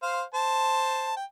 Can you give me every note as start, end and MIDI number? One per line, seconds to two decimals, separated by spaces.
0.02 0.23 72
0.02 0.23 77
0.34 1.14 72
0.34 1.14 81
1.16 1.24 79